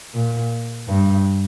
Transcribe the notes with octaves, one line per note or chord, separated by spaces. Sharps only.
A#2
G2